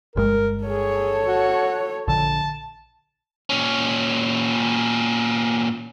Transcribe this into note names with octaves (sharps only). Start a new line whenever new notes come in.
G1 G2 G#3 A#4
G#4 A4 C#5
F#4
A#1 D3 A5
A#2 C#4